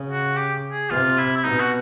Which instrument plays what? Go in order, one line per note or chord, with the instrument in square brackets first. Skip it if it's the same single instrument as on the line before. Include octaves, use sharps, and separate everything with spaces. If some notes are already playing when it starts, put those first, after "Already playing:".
Already playing: [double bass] C#3
[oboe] F#4
G4
G#4
[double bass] C3 [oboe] F4
[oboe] E4
E4
[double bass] B2 [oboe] D#4
[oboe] F#4